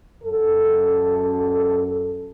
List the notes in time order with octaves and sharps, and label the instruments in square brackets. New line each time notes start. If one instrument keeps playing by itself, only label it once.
[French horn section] F#2 A4